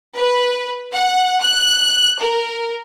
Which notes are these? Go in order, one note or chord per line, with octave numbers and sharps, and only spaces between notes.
B4
F#5
F#6
A#4